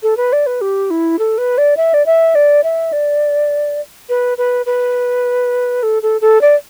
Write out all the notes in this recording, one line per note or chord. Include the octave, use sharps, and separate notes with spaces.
A4
B4
D5
B4
G4
E4
A4
B4
D5
E5
D5
E5
D5
E5
D5
B4
B4
B4
A4
A4
A4
D5